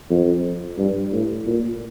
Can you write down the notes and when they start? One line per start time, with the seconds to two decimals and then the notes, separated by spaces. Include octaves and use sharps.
0.10 F2
0.78 G2
1.12 A2
1.46 A#2